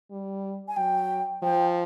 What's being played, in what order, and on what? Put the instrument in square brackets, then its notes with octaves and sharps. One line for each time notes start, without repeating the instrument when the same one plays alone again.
[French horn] G3
[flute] G#5
[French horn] F#3 [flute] G5
[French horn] F3 [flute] G5